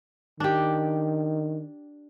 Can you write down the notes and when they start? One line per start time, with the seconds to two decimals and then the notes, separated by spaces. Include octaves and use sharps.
0.40 D#3 D4 G4